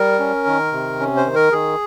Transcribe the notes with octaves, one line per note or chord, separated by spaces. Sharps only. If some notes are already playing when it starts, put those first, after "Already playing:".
Already playing: G3 A#4
C#4
D#3
C3
C#4
C5
D#3
A#4
D#3 G#4